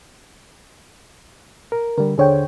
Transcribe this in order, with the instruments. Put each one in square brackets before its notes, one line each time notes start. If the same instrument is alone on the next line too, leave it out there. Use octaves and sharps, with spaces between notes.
[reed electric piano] A#4
[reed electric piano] D3 G3 [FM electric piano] A#4
[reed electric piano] D#2 D3 C5 [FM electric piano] G#4 C#5 G5